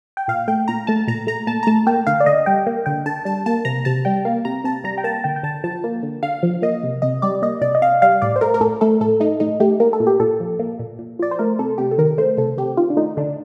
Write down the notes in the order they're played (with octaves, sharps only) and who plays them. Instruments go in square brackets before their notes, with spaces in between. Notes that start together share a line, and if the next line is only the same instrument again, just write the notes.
[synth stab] G5
A#2 F5
A3 G5
A#2 A#5
A3 A5
A#2 A#5
A3 A#5
A#2 A5
A#5
A3 A5
A#3 G5
D3 F5
D5
D3 D#5
G3 G5
A#3
D3 G5
D3 A5
G3 A5
A#3 A5
C3 A#5
C3 A5
G3 G5
A#3 F5
C3 A#5
C3 A5
G3 A#5
G5
A#3 A5
D3 G5
G5
D3 A5
F3 A5
A#3
D3
D3 F5
F3
A#3 D#5
C3
C3 D#5
G3 D5
A#3 D#5
C3 D5
D#5
C3 F5
G3 F5
A2 D5
C5
A3 A#4
A#4
A2 A4
A3 A4
A2 A4
A3 D#4
A2 D#4
A3 G4
A#3 A#4
A4
A#2
G4
A#2 A4
F3
A#3
A#2
A#2
F3 D5
C5
A3 A#4
C3 A4
C3 G4
A4
D#3 A#4
A3 C5
C3 A4
C3 G4
D#3 F4
D4
A3 D#4
D3 D4